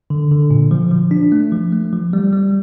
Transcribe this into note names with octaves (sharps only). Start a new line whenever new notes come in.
D3
D3
A#2
F3
F3
D4
A3
F3
A3
F3
G3
G3